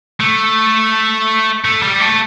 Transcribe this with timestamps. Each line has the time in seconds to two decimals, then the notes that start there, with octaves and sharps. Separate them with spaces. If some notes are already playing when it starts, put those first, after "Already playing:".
0.20 A3
1.65 A3
1.82 G3
2.00 A3